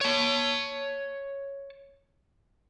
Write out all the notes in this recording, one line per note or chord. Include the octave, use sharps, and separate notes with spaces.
C#5 A5